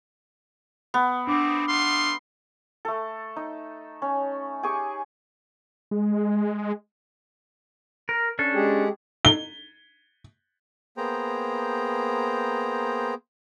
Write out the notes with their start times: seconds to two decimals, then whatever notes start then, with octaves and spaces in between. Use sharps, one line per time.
0.94 B3
1.27 A3 C4 D4 D6
1.68 A3 F5 C6
2.85 A3 A4
3.36 D#4
4.02 C#4
4.63 G4 G#4 G#5 C#6
5.91 G#3
8.09 A#4
8.39 C#4 D4 A4
8.55 G#3 G4 G#4
9.25 G7
10.97 A#3 B3 G#4 C5 G5 A#5